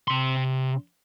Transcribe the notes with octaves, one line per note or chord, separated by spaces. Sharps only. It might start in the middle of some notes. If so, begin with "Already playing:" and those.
C3 C6